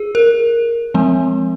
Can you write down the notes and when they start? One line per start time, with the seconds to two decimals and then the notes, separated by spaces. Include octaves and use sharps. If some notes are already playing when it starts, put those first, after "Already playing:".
Already playing: G#4
0.15 A#4
0.94 F3 G#3 C4